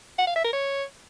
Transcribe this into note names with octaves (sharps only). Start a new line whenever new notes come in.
F#5
F5
E5
A#4
C#5